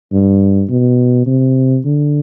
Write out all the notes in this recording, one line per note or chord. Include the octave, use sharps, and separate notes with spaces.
G2
B2
C3
D3